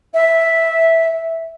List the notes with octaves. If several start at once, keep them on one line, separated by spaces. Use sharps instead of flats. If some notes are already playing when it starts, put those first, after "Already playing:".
E5